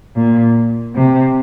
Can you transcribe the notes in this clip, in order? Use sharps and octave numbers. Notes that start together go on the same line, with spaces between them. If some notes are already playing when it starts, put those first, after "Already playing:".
A#2
C3